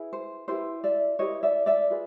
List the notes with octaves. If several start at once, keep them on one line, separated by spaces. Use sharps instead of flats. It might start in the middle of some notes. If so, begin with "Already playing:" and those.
Already playing: E4 G#4 B4
C5
E4 G4 B4 C5 D5
D5 E5
E4 G4 B4 C#5 D#5
D5 E5
D5 E5
F4 G#4 B4